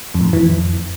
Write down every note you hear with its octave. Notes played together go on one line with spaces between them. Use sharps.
F2
A2
F#2
E3
F2